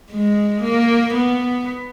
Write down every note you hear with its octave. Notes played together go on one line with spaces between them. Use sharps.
G#3
A#3
B3